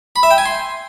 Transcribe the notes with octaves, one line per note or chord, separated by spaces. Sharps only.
B5
E5
G5
G#5
C6